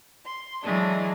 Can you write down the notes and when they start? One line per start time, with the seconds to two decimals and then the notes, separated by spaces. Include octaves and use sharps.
0.25 C6
0.63 E3 F#3 G#3 A3 D4